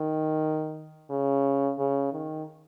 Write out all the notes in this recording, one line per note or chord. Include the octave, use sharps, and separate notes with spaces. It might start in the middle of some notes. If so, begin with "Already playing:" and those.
Already playing: D#3
C#3
C#3
D#3